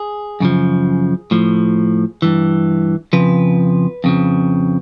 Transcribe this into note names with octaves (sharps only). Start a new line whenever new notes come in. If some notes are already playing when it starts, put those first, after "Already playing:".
Already playing: G#4
F#2 C#3 F3
A2 F3
G2 E3
F2 C#3 F3 B4
F2 C#3 F3